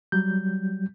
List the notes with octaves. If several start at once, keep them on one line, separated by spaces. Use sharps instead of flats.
F#3 G3 G6